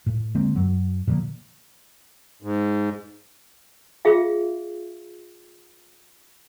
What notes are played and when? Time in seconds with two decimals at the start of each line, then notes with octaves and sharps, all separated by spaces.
0.06 A2
0.35 D3 G#3 A#3 C4
0.55 F#2 F#3
1.07 A#2 D3 F3 A#3
2.42 G#2
4.05 F4 G#4 E5 F5